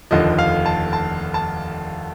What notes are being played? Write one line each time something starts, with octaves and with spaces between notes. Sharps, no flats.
F1 D#2 D3 F3 D#5
F5
A5
A5
A5